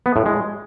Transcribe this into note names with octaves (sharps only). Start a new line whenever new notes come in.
B3
A2
G#3